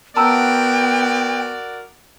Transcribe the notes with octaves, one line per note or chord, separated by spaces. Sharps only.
B3 F#4 A#4 D5 G5 A5 A#5 E6